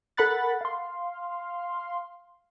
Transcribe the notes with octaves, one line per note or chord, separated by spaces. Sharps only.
A4 A#4 F#5 B5 F#6 A6
F5 C6